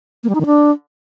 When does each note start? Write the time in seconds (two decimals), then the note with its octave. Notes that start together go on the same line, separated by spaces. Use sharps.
0.24 A#3
0.29 G3
0.35 D#4
0.40 D#3
0.46 D4